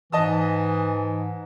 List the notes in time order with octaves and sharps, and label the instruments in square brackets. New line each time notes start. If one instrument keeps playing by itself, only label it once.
[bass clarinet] G#2 [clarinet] E3 [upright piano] D#5 A5 D#6